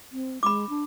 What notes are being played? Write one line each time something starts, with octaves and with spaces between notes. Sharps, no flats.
C4
G#3 B5 D6
D4